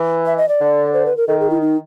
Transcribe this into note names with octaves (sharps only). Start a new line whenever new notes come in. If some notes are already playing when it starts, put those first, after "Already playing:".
Already playing: E3
E5
D#5
D5
D3
C5
B4
A#4
D#3 A4
G#4
E4
D#4